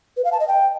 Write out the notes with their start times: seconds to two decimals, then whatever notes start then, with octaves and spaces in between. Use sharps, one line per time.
0.17 B4
0.25 F5
0.32 A5
0.40 D#5
0.48 G5